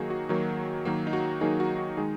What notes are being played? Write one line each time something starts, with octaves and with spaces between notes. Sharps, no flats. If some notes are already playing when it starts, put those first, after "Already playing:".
Already playing: D#3 F#3 A#3 D#4 F#4 G#4
F#4
D#3 F#3 A#3
D#3 F#3 A#3
D#4
F#4
D#3 F#3 A#3 D#4 G#4
F#4
F#4
D#3 G#3 D#4 G#4